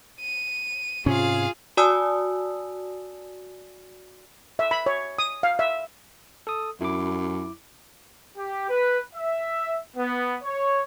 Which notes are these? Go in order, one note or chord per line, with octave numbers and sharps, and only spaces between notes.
D#7
G#2 C3 C#4 F4 G#4 F5
F#4 D5 G#5 A5 D#6 E6
E5
B5
C#5
D#6
F5
E5
A4 D#6
F#2 E4 D6
G4
B4
E5
B3
C#5